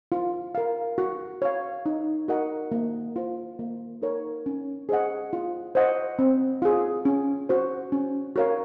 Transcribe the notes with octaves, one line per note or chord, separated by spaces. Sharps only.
F4
A#4 F5
F#4
C#5 F5
D#4
F#4 A#4 D#5 F#5
A#3
F4 C5
A#3
D#4 A#4 C#5
C#4
G#4 C5 D#5 F#5
F4
C5 D#5 F#5
C4
F4 G#4
C#4
F#4 C5
C#4
F#4 A#4 C#5 F5